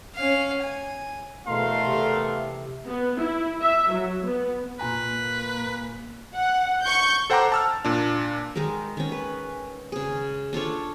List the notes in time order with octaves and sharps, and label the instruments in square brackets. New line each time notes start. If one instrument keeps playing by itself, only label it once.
[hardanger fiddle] C#4 F5
G#5
[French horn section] E2 A3 [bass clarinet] B2 [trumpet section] A#4 F5 C6
[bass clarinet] C3
[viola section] B3
E4
E5
F#3
B3
[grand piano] A#2 G#5 A#5 [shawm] B4
[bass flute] A#3
[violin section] F#5
C#6 G6
[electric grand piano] A4 C5 F#5 G5 A#5 D6
A5 E6 F6
A#2 D4
[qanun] D#3 G#3 D#4 A#4
D#3 C#4
B4
C#3 G#4
D4 F4 A4 C#5